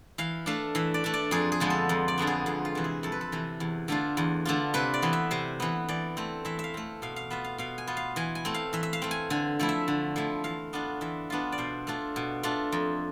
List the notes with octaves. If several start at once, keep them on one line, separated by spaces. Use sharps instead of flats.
E3 F5
A3 D4 F5
E3 E5
D5
A3 D4
D5
F2 G#4
G#4
D3 F3 G#3 B3
A4
F2
D5
D3 F3 G#3 B3
G#4
F2 G#4
F4
C3 E3
G#4
F2 A4
B4
A4
C3 E3
E2
D3 A3 D4 F4
E2
D3 A3 D4 F4
C3 B4
D5
E3 B3
E5
C3 C5
E3 B3
E3 D5
A3 C4
E3 E5
E5
F5
A3 C4
B2 F5
F5
B3 F4 E5
F5
B2 F5
G#5
B3 F4
F5
E3 G#5
G#5
A3 C4
F5
E3 E5
E5
F5
A3 C4
G#5
D3 G#5
F3 A3 E4
E5
D3
F3 A3 E4
E3 F5
B3 D4 F4
E3 E5
B3 D4 F4
D5
B2 C5
A3 D4 F4
B2
A3 D4 F4
F2